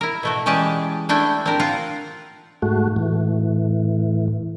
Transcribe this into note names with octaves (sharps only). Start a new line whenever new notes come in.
E4 A#4
B2 A3 F#4
E3 G#3 C#4 G4 D5 A5
A3 D4 E4 G5
C4 D4 G4 A#4
F4 F#5
G#2 A3 F#4
A2 E3